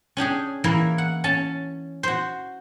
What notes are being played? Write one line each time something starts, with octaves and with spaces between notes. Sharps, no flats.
C#4 D4 G4 G#4
E3 A#3 E4 A#4
F#5
C#4 A5
F#4 C5